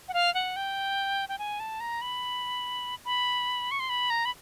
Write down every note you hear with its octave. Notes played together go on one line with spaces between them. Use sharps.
F#5
F5
F#5
G5
G5
G#5
A5
A#5
B5
B5
C#6
C6
B5
A#5
B5